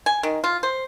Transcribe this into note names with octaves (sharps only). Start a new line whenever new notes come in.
G#5
D#3
F4
C5